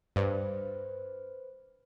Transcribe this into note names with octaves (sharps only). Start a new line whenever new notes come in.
G2 B4 C5